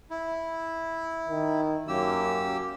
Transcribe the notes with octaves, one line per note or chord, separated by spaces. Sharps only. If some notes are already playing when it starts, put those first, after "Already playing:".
E4
D#3
F#2 A#3 G4 E6